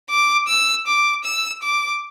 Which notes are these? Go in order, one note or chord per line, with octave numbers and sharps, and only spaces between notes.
D6
E6
D6
E6
D6